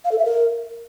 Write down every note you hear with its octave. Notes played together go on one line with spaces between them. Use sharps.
F5
A4
E5
A#4